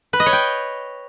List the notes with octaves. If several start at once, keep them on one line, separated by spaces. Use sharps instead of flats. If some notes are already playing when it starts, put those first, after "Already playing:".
B4
D#5
C#5
G5